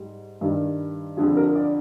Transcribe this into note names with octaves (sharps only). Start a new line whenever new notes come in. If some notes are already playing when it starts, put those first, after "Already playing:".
Already playing: G#2 G3
G2 D#3 G3
F2 D3 F3 G#4
A#4
D5